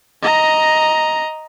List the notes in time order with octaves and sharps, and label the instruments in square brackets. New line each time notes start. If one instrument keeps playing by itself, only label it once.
[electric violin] D#5 A#5